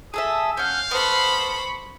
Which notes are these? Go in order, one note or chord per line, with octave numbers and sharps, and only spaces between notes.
G#4 A4 E5 D#6
C#4 F5 F#5 G6
B3 A4 C5 B5 C#6